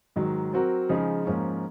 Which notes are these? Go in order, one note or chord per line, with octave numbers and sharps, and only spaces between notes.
G#2 D#3 F#3
F#3 C4 F#4 A#4
C#3 F3 G#3 D#4 G#4
G#2 F3 A#3 C#4